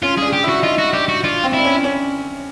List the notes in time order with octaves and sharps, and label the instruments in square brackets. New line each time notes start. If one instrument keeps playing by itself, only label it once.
[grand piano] C#4 [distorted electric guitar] F4
[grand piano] D4 [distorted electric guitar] G#4
[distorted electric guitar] G4
[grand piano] E4 [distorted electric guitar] F#4
[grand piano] D#4 [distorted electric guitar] F4
[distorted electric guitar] F#4
[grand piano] D4 [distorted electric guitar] G4
[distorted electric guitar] F#4
[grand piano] D4 [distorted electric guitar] F4
[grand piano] C4
[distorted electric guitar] E4
[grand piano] D4
C#4
C#4